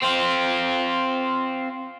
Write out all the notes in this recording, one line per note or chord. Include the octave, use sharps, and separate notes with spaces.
C4 F4